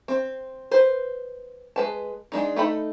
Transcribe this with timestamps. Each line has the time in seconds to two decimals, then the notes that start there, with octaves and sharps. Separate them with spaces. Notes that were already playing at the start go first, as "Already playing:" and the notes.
0.08 C4
0.71 B4 C5
1.76 G#3 B4 A5
2.32 G#3 D4 D#4
2.56 A3 D#4 A4 B5